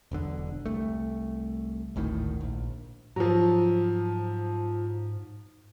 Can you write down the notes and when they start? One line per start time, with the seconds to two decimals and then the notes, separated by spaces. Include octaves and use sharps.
0.11 E1 B1 D3
0.66 C2 A3
1.96 G#1 D2 A2 D#3
2.41 A#1
3.16 G#2 F3 F#3